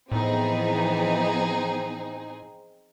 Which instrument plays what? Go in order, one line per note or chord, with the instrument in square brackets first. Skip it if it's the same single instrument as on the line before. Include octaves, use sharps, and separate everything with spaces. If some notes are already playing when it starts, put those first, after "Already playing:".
[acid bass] A2 [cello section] E3 F3 B3 [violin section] C4 D#4 G#4